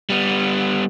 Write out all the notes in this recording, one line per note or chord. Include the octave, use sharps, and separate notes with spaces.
G3 B3